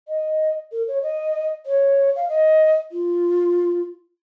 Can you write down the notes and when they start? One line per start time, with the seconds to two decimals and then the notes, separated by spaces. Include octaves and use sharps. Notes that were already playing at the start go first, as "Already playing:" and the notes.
0.08 D#5
0.72 A#4
0.87 C#5
1.02 D#5
1.66 C#5
2.16 F5
2.29 D#5
2.92 F4